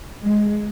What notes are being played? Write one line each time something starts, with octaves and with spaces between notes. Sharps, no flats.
G#3